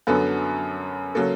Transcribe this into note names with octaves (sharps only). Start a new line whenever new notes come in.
F#2 D3 F#3 B3 A4
C#3 F#3 A#3 A4